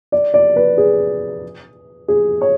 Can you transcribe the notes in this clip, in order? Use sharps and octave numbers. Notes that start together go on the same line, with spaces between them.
D5
D5
B4
G#4
G#4
C#5